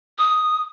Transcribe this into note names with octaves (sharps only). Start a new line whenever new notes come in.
D#6